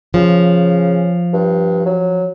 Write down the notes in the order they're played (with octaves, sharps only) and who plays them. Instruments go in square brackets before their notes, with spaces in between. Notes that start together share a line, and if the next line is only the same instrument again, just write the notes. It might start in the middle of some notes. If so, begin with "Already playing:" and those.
[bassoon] C#3 [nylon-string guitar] F3
[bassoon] G2
F#3